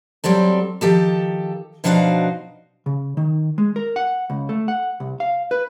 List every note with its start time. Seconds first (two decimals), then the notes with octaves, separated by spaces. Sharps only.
0.24 F#3 G3 C4 A4
0.81 D#3 F3 G4 A4
1.84 B2 F3 D4 D#4 F#4 F5
2.86 C#3
3.17 D#3
3.58 G#3
3.76 A#4
3.96 F#5
4.30 C#2
4.49 A3
4.68 F#5
5.00 C2
5.20 F5
5.51 B4